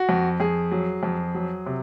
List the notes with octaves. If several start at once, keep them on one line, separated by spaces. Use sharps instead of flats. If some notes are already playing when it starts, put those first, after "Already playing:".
Already playing: F#4
F2
F2 G#4
F#3
F2
F#3
C3